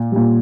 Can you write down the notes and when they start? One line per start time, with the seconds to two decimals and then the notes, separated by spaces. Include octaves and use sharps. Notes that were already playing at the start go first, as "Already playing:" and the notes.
Already playing: A#2
0.12 A#2 G3